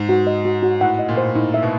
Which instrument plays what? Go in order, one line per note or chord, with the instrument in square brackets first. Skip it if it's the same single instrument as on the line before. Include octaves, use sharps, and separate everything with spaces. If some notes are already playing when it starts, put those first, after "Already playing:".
Already playing: [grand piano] G#2
[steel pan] F#4
D#5
F#4
F#4
[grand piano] A2 [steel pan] F#5
[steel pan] D#5
[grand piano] A#2
[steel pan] C5
[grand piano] A2 [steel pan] D#4
[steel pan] E5
[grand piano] B2